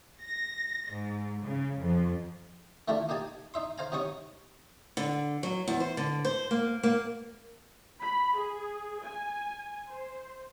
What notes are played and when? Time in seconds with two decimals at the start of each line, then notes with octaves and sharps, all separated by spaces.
0.22 A#6
0.92 G#2
1.43 C#3
1.78 F2
2.88 D#3 E3 A3 D4 E4 F4
3.09 A#3 D#4 G4 G#5 A5
3.54 D#4 E5 C6
3.78 C5 F5 G#5 A#5
3.92 C3 F#3 C#4 D#4 C#6 D#6
4.97 D3
5.43 F#3
5.68 E2
5.80 C5
5.97 D3
6.25 C5
6.51 A#3
6.83 A#3
8.01 B5
8.38 G#4
9.04 G#5
9.89 C5